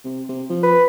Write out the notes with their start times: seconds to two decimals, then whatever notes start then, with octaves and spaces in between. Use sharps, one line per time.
0.04 C3
0.29 C3
0.50 F3
0.63 B4